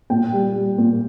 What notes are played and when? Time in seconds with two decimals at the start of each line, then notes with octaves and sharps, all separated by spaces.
0.10 A#2 G5
0.33 G3
0.55 G3
0.78 A#2